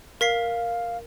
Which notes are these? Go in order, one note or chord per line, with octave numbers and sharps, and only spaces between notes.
A#4 F5 B6 C7